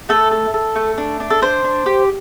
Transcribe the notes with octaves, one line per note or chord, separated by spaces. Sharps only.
A3 A4
A4
A4
A3
D4
D4
A4
D4 C5
D4
G4